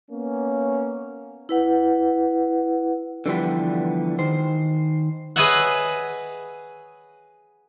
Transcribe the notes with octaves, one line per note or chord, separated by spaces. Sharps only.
A#3 B3 C#4
E4 B4 F#5
D3 E3 F3 G3 B3
D#3 C5
G#4 B4 C#5 D#5 E5 F#5